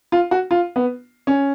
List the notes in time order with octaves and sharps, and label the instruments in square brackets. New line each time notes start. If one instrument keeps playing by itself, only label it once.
[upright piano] F4
F#4
F4
B3
C#4